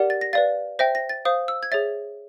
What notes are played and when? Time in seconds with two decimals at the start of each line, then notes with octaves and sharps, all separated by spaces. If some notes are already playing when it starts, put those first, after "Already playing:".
Already playing: G4 A#4 D5 F#5
0.10 A6
0.21 A#6
0.33 B4 D5 F5 A6
0.79 C5 E5 G5 A#6
0.95 A#6
1.09 A6
1.25 C5 F5 D#6
1.48 E6
1.63 G#6
1.72 G#4 C#5 E5 A6